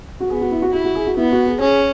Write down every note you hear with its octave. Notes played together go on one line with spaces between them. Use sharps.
F#4
B3 G#4
F#4
E4
F#4
E4 F#4
F#4
G#4
F#4
B3 E4
F#4
G#4
C#4 G#4